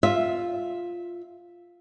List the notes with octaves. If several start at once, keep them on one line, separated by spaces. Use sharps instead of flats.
F4 E5